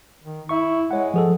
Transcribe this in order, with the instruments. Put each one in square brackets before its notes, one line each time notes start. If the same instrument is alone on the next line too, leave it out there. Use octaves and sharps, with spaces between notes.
[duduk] D#3
[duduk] E4 [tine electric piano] E5 C#6
[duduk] G#3 [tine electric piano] C#5 F#5
[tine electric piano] F3 G#4 A4